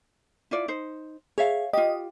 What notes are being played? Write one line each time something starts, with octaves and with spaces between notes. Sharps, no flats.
E4 F4 D5
D#4 C5
G#4 C#5 E5 F5
F4 G4 D#5